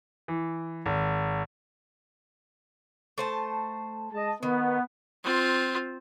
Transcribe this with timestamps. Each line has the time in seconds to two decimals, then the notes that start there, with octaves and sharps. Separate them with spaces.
0.28 E3
0.86 G#1
3.18 A3 C5 A5
4.12 G#3 D#5 A5
4.43 D#3 B3
5.24 C4 F4